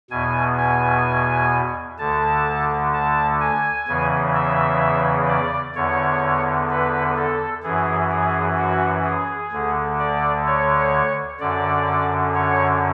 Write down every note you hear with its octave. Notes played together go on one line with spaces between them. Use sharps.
E2 B2 G#5
G#5
D2 D3 A5
A5
G#5
E2 C#3 E3
E5
D5
E2 D3 C#5
B4
A4
F#2 E3 G#4
G#4
F#4
G#4
D2 D3
D5
C#5
F#2 D3 D5
C#5